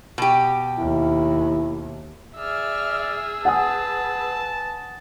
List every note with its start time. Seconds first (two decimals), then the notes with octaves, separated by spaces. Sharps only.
0.18 B2 G4
0.79 D#2 E4
2.36 G#4 D5 E5 E6 F6
3.45 B4 F#5 G#5 A5 D#6